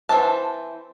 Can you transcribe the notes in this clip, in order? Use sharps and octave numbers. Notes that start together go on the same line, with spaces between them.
E3 C4 C5 A5